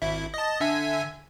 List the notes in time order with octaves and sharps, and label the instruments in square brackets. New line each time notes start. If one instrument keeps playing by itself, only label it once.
[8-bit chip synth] G#1 E4
D#5 A5
D3 E5 G#5